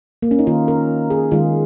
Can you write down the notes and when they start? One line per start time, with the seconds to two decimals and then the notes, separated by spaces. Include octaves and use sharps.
0.22 A#3
0.31 C#4
0.39 D#4
0.47 D#3 A#3 F4
0.68 A#4
1.10 G#4
1.31 D#3 G#3 F4